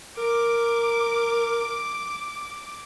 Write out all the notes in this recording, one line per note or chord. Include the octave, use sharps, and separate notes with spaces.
A#4 D6